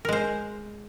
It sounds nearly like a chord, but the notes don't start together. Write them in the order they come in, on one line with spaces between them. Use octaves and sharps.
A#4 G#3 C5